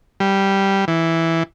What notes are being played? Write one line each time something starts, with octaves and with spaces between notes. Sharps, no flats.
G3
E3